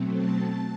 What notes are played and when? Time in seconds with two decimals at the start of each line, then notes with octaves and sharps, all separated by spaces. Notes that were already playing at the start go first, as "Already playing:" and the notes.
Already playing: B2 F#3 A3 C4
0.16 A5